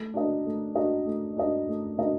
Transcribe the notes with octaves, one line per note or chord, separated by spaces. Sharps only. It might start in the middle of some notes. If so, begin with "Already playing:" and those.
Already playing: A3
D4 F#4 A#4 D#5
A3
D4 F#4 A#4 D#5
A3
D4 F#4 A#4 D#5
A3
D4 F#4 A#4 D#5